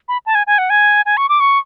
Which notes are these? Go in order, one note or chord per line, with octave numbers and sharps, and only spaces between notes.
B5
A5
G#5
G#5
F#5
G#5
G#5
C#6
D6
C#6